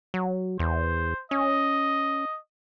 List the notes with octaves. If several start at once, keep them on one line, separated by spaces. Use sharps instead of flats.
F#3
E2 C5
C#4 D#5